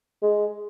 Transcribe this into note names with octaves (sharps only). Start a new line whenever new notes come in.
G#3